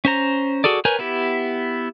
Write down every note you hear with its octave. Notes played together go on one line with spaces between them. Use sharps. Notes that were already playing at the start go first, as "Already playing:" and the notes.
C#4 C5 A#5
F#4 G#4 A4 D5
A#4 B4 C#5 G#5 G6
B3 E4 G4